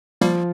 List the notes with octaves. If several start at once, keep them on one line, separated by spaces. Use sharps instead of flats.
F3 G3 A#3